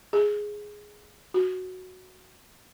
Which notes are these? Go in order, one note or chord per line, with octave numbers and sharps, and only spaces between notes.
G#4
F#4